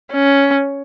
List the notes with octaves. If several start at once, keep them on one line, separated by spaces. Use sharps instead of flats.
C#4